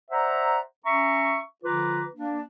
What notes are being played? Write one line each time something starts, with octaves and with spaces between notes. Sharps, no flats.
C5 D5 E5 F#5 A#5
C#4 E5 A#5 C#6
D3 F3 F4 B4 A#5 D6
A#3 D4